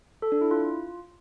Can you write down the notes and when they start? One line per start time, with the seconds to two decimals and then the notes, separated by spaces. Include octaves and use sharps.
0.22 A4
0.32 D4
0.41 E4
0.51 F4